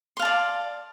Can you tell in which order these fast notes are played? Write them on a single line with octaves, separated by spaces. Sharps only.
C6 F5 A5 D5